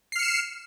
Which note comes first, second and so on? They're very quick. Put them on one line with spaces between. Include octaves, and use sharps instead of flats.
C7 F6 C#7 E7